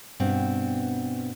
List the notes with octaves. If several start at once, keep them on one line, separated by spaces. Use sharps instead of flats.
G2 B2 B3 C4